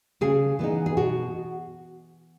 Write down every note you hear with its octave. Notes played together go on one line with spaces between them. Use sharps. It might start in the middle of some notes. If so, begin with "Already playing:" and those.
C#3 G#4
E3 B3 D#4
G#4
B2 F#4